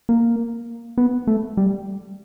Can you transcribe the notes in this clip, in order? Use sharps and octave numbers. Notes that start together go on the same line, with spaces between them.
A#3
B3
A3
G3